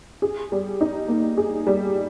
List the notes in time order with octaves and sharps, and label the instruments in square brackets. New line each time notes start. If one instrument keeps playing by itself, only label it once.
[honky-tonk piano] G#4
G3
D#4
A#3
G#4
G3